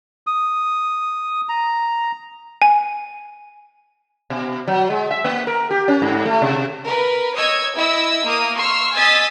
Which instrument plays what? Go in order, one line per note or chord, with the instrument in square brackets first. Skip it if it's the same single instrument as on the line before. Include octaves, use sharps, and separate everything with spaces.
[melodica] D#6
A#5
[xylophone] G#5
[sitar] B2
F#3
G#3
E5
A#3
A#4
G4
C#4
G#2
A3
C3
[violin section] A#4 B4
C#5 D#5 D#6 E6 G#6
E4 D#5 E5 E6
A#3 D#6
C6 C#6 E6 F6
D#5 G#5 D#6 E6 A6 B6